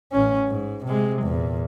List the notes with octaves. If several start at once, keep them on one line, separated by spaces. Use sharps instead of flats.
A1 C#4
G#2
C3 G#3
E2 A#2